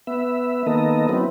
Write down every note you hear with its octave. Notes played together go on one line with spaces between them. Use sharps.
B3 E5
D#3 A#3 B3 A4 D#5
F#3 B3 C4 E4